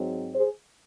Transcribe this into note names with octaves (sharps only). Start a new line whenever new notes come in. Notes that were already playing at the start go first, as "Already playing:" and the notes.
Already playing: G#2 F#3 C4
G#4 C5